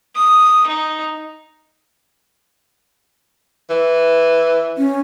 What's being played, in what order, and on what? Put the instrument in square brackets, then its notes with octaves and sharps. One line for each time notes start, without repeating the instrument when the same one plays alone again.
[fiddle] D#6
D#4
[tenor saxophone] E3
[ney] C#4